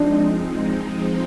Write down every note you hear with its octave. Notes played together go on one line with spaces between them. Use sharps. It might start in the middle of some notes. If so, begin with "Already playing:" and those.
Already playing: F3 G#3 C4 D4 D#4